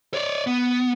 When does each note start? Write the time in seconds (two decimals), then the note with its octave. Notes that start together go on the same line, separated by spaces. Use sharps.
0.14 C#5 D5
0.47 B3